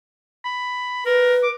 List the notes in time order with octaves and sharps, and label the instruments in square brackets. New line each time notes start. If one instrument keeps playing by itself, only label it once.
[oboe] B5
[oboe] A#4 [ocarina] B4
[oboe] D6